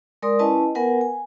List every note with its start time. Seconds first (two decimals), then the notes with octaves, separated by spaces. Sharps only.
0.22 G#3 A#4 D5 C6 D#6
0.39 C#4 E4 B4 D#5 G#5 A5
0.75 B3 A#4 B4 F#5 G#5
1.01 G#5